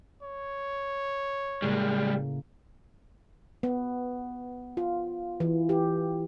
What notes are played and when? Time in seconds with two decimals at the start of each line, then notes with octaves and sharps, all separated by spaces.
0.22 C#5
1.62 A2 C#3 G3 G#3 A#3
3.63 B3
4.77 F4
5.40 E3
5.69 G4